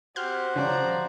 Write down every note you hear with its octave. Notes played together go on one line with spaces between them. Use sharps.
C4 F#4 G4 C5 F6 G6
C#3 F3 C#4 D5 A#5